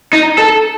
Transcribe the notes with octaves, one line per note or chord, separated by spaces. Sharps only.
D#4
A4